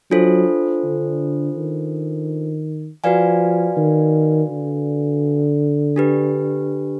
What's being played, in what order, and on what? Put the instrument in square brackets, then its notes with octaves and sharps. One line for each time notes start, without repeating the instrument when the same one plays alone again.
[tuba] F#3 [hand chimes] D4 F4 A4 C5
[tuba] D3
D#3
[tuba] F3 [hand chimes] F#4 B4 D5 F5 G#5
[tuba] D#3
D3
[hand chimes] D4 G4 B4